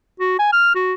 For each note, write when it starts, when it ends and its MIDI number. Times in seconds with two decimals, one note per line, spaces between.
0.20 0.37 66
0.39 0.53 80
0.53 0.73 89
0.75 0.94 66